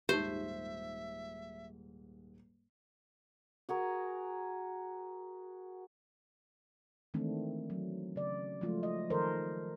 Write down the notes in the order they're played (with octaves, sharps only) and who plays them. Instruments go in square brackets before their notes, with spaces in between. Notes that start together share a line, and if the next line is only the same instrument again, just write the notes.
[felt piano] D#1 G#2 [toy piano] D#4 G4 [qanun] C5 [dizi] E5
[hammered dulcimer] F#4 G#4 A#4
[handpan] D#3 E3 G#3 A3 C4 D4
F#3
C#3 D5
F3 F#3 G#3 A3 F4
D#5
D#3 F3 A4 A#4 C5